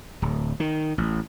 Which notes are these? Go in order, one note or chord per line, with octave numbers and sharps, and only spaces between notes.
D1
D#3
A1